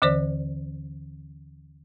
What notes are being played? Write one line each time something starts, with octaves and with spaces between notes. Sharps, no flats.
D#2 D3 E3 C5 D5